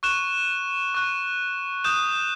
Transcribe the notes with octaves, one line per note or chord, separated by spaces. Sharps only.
C#6 F#6 E7
C#6 F#6
D#6 G6 E7